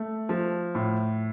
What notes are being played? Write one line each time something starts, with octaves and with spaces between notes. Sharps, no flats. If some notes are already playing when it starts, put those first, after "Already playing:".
Already playing: A3
F3
A2